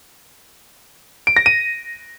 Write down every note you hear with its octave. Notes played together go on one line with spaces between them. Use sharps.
D7
A#6
D#7